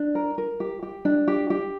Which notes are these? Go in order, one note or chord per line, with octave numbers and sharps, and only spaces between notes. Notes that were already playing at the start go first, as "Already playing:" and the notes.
Already playing: D4
A#4
A#4
G4
G4
D4
G4
G4